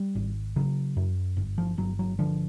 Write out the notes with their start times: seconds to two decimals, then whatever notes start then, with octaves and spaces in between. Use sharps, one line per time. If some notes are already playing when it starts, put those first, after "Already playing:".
Already playing: G3
0.15 G#1
0.56 C#3 F#3
0.97 F#2
1.37 G1
1.58 F3
1.78 G1 F#3
1.99 F#3
2.19 D3 F3